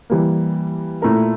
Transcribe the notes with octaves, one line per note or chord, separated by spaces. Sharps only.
E3 G3 A#3
A#2 A3 E4 A#4